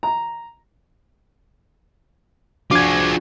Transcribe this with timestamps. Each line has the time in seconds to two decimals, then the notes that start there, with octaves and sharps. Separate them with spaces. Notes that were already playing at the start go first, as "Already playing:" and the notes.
0.03 A#5
2.71 F3 D4 F4 F#4 G#4 D6 G#6